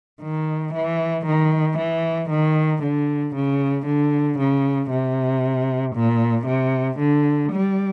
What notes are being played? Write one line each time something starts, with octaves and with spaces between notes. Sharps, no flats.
D#3
E3
D#3
E3
D#3
D3
C#3
D3
C#3
C3
A#2
C3
D3
G3